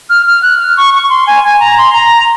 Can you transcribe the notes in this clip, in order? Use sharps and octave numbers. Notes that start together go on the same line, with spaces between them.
F6
F6
F#6
F6
C#6
C#6
C6
G#5
G#5
A#5
C6
A#5